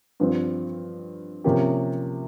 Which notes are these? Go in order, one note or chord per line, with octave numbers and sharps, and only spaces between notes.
G2 F3 C4
C3 F3 A#3 C#4 G4